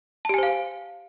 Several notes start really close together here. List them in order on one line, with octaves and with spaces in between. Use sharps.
A5 G4 G#5 C5 F5